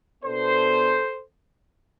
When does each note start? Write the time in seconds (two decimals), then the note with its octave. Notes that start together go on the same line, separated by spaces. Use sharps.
0.23 B2 B3 D4 A4 C5